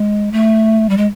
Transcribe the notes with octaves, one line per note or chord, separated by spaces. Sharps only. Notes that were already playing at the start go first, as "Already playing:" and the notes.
Already playing: G#3
A3
G3
G#3